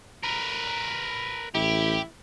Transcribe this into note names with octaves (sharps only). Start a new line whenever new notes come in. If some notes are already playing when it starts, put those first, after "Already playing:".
A#4 B4
A1 E4 G4